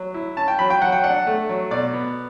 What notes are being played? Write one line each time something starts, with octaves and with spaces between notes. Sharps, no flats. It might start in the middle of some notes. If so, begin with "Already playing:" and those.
Already playing: F#3
E4
C#4 A5
G5
F#3 B5
G5
F#3 F#5
G5
D4 F#5
A3
F#3
B2 D5
B3